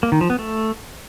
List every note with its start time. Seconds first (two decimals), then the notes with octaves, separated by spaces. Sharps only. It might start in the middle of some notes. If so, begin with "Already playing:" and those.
0.03 A#3
0.12 D#3
0.21 F3
0.30 B3
0.39 A3